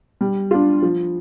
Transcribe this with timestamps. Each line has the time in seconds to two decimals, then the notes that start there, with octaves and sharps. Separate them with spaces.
0.21 G3
0.51 D4 F4
0.82 F3